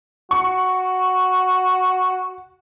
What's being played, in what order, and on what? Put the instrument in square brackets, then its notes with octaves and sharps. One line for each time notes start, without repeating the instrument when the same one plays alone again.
[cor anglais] F#4 [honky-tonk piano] C#6